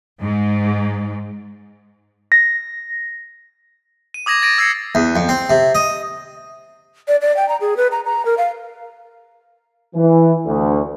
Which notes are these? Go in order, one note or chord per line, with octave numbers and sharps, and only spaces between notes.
G#2
A#6
D#7
D6 D#6 G#6 A#6 D#7 E7
D#6 A6 A#6 D7 D#7
E6 G#6 A#6 C7 C#7 E7
E2
F2
C4
C3
D#5
D5
D5
G5
A#5
G#4
B4
A#5
A#5
A#4
F5
E3
D2